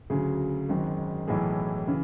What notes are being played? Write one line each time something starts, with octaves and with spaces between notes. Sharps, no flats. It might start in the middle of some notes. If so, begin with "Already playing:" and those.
D2 C#3 F#3 G#4
G#1 F#2 D#3 G#3
B1 A2 E3 G#4
C#3 E3